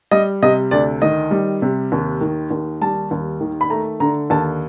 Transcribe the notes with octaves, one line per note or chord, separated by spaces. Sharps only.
G3 D#5
C3 D#5
D2 D5
D#3 D#5
G3
C3
D#2
D#3
D#2
G3 A5
D#2
D#3
B5
A3 A#5
D3 A#5
D#2 A5